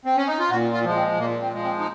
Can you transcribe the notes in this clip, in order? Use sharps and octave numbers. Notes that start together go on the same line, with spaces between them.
C4
C#4
D#4
F4
A#2 F#4
F4
F3 G#3
C4
A#2 A#3
C4
F3 G#3
C4
D#4